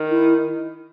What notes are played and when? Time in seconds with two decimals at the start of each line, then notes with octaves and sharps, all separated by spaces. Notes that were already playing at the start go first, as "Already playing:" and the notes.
Already playing: D#3
0.10 E4